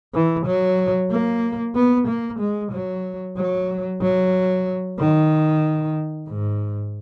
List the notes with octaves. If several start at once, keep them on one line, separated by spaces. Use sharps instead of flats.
E3
F#3
A#3
B3
A#3
G#3
F#3
F#3
F#3
D#3
G#2